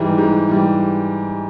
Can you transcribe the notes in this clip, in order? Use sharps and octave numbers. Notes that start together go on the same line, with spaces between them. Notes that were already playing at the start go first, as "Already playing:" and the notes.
Already playing: G#2 E3 G3
G#2
E3 G3